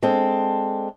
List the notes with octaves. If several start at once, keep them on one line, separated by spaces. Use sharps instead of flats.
G#3 C4 D4 A4